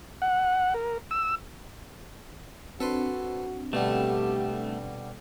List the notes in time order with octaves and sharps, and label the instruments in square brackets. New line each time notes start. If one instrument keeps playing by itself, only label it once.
[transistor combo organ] F#5
A#4
E6
[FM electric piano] C4 D4 [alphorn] F#4 [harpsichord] A4 B4 C6
[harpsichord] B2 D3 G3 [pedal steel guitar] A3 [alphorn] G4